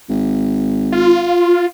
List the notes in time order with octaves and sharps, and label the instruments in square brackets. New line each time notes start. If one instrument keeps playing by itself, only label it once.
[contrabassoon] G#1
[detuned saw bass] F4